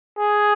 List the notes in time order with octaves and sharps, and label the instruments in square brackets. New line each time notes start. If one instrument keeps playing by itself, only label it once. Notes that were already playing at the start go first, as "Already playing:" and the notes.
[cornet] G#4